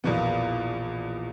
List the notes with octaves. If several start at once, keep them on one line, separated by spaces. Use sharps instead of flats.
A#1 E2 B2 B3